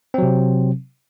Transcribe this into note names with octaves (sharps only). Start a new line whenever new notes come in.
C3 F#3 C4